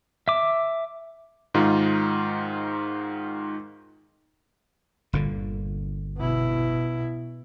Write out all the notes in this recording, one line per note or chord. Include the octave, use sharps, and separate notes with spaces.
E5 D6
G#2 D#3 D#4 F4
G1 A#2 D3
B2 E4